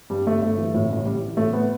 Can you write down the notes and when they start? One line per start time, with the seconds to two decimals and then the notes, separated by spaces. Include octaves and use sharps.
0.10 G2 G3
0.27 G1 A3
0.42 G1 A3
0.58 E3
0.75 A2
0.90 A1
1.05 A1 G3
1.22 E3
1.37 A2 A3
1.53 B3